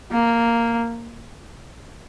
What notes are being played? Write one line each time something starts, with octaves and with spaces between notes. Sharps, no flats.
A#3